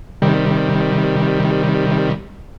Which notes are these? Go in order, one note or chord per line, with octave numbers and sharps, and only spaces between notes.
C3 D#3 G3